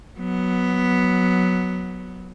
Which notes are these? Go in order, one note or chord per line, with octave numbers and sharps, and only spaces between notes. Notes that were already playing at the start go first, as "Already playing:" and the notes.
F#3 B3